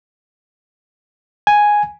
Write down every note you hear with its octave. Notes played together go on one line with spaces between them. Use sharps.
G#5